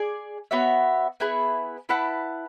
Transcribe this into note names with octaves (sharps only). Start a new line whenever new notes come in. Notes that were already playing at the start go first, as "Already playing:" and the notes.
Already playing: G#4 D5 G#5
B3 F#4 C#5 E5
B3 E4 G#4 B4
E4 B4 F#5 A5